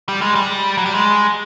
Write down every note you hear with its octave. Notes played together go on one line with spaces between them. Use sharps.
G3
G#3
G3
F#3
G3
G#3